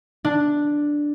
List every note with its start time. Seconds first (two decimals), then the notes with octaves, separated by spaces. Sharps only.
0.25 D4